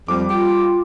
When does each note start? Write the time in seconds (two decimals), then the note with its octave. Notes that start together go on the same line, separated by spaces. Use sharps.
0.08 F2 G3 D6
0.30 F4 G4